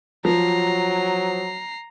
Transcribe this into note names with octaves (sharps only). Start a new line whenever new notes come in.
F3 F#3 A#5 C7